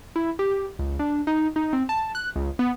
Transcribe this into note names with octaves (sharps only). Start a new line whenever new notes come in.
E4
G4
C#2
D4
D#4
D#4
C4
A5
F#6
C#2
B3